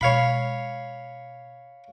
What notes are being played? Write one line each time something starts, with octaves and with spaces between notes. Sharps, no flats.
B2 G#3 C#5 F5 B5